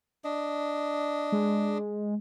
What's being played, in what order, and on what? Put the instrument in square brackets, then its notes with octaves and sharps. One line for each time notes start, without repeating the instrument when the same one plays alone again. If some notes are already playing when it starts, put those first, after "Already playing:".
[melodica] D4 D#5
[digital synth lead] G#3